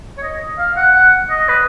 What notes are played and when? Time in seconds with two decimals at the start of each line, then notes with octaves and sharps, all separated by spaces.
0.18 C#5
0.23 D#5
0.58 F5
0.76 F#5
0.94 F#5
1.30 D#5
1.48 B4